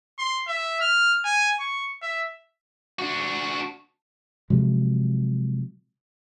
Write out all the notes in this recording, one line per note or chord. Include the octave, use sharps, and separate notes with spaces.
C6
E5
F6
G#5
C#6
E5
D4 F#4
C3 F3 F#3 G#3